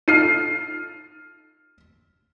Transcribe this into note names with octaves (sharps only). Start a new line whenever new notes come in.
D#4 F4 A4 F6 C7 D#7